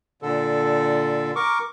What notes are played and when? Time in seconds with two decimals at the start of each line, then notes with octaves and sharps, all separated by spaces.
0.22 A#2 D3 A4
1.36 A#4 C#6 D6